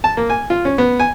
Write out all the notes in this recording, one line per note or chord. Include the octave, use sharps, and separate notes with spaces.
A5
A#3
G#5
F4
C#4
B3
G#5